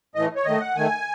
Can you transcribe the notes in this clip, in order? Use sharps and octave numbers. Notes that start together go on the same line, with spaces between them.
A2 E3 A3 D#5
C#5
D#3 A3 D#5
F#5
D#3 A3 G#5